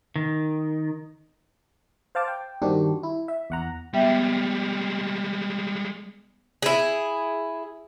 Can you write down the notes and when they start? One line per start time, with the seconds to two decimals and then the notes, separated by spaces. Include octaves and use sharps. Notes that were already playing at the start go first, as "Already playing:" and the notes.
0.16 D#3
2.15 C5 F5 A5 D6
2.28 G5
2.62 G2 D#3 C4 D4 F#4 G4
3.03 E4
3.28 E5
3.50 E2 F#5 A#5
3.94 G3 G#3 B3 E5 G5
6.62 E4 G#4